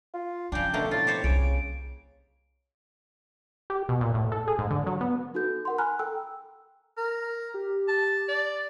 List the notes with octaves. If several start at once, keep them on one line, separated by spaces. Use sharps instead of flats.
F4
C#3 F3 D4 G5
B2 D3 A3 A#3
A2 F4 A6
G4 C5 C#5
C2 C#3 C#5 D7
G4
B2
A#2
A2
A4
G#4
G#2
D3
F#3
B3
D#4 F#4 A4 G6
A#4 F#5 C6
G#5 A#5 B5 F6 F#6
A4 G5 E6
A#4
G4
A5
D5